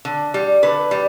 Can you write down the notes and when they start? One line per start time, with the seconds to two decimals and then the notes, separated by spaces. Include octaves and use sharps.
0.05 D3
0.34 G3
0.63 D3 B4
0.91 G3